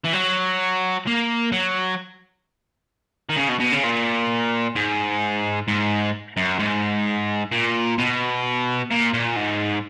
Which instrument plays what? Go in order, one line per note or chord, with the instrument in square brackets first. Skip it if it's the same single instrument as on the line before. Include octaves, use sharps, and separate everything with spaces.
[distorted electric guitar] E3
F#3
A#3
F#3
D#3
C#3
B2
B2
C#3
A#2
G#2
G#2
F#2
G#2
A#2
B2
A#2
A#2
G#2